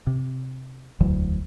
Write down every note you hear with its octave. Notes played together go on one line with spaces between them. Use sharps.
C3
E1 D2 E3 F#3